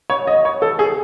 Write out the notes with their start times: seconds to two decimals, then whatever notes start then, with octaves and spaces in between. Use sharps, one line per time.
0.10 C#5
0.27 D#5
0.45 C#5
0.62 A4
0.79 G#4